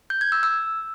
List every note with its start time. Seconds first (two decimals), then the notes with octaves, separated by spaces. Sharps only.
0.10 G6
0.21 G#6
0.32 E6
0.43 E6